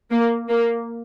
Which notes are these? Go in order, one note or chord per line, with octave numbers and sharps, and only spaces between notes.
A#3
A#3